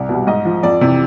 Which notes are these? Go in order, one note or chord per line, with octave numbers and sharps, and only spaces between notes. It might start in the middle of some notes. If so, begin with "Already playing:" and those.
Already playing: C2 D5
B2 G3
G#2 D#5
F3
F2 D5
C3 E3